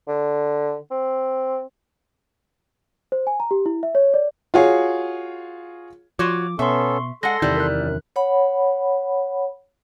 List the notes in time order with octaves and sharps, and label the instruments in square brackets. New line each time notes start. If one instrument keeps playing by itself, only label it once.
[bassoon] D3
C4
[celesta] C5
G#5
A#5
G4
E4
E5
C#5
D5
[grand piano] F4 F#4 G#4 C#5
[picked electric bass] F3 [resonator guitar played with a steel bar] F4 F#4 C#5 [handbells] D6
[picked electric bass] B2 [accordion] B3 C#4 A4 [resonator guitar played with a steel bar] E5 [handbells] C6 C#6
[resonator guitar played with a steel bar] G#3 F#5 [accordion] A4 C6 [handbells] A#6
[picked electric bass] E2 C3 D#3 [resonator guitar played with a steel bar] G3 E4
[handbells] A#4 F#6
[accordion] F#2
[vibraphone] C#5 F#5 B5